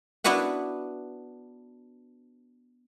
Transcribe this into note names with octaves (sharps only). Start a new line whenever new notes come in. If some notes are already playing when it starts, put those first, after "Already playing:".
B3 D4 E4 F#4 B4 F#5